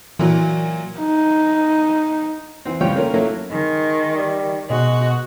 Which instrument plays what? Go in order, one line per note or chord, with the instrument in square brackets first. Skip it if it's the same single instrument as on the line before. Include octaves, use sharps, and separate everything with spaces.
[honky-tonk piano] A#2 F#3 [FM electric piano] E3
[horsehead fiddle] D#4
[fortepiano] E3 C4
C#2 F3 G3 F4 C#5 G5
A3 A#3 C#4 F4 A#4
F#3 A3 A#3 C#4 E4
[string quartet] D#3 [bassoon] G#3
[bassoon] G3
[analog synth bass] B2 [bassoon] G#3 [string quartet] F#4